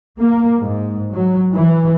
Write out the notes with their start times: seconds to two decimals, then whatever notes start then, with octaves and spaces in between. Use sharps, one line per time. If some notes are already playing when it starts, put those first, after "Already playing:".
0.22 A#3
0.61 G#2
1.14 F#3
1.54 E3